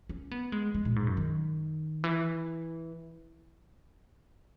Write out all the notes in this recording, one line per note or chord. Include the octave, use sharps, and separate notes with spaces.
C#4
B3
G#3
G#3
A#2
G#2
F#2
D#3
E3